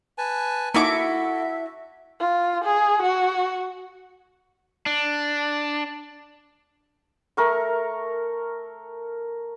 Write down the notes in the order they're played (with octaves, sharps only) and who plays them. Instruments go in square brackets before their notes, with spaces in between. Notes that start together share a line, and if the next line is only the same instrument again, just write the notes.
[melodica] B4 G#5 A5
[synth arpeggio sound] A#3 D#4 [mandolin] E4 F#4 D6 [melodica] A4 [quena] E5
[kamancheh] F4
G#4
F#4
[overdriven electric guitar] D4
[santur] A3 A#4 C#6